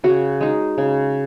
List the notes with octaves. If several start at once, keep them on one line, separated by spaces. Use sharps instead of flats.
C#3 F#4
G#3 D#4
C#3